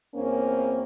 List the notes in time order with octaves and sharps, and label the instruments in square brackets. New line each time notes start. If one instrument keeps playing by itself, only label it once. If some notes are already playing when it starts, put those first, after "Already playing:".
[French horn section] E2 A#3 C4 C#4